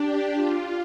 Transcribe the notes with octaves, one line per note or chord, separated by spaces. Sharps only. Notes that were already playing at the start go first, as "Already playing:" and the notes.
Already playing: D4 G4
F4